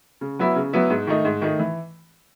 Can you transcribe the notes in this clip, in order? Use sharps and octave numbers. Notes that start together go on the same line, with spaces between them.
C#3
F#3 B3 E4
C#3
F#3 B3 E4
G#2
D#3 A3 D#4
G#2
D#3 A3 D#4
E3